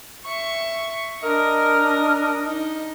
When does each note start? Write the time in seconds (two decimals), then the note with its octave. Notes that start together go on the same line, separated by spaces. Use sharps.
0.25 E5 C#6
1.24 D4 A#4 D#5 A#6
2.45 D#4